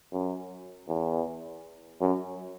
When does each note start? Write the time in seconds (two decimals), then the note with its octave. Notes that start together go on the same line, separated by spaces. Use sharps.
0.12 F#2
0.88 E2
2.01 F#2